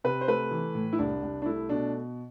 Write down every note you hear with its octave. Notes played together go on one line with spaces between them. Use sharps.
C3 B4
C5
A3 B4
E3
A2
E4
C2 D4
C2
D4
A3 E4
B2 D4